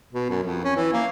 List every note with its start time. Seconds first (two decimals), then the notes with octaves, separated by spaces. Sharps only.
0.13 B2
0.30 F#2
0.43 F2
0.64 C#4
0.76 E3
0.93 A#3